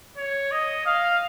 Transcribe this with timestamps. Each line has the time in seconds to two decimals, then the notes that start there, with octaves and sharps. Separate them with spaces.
0.17 C#5
0.52 D#5
0.86 F5